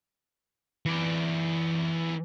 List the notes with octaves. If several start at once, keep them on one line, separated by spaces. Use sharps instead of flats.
E3 D5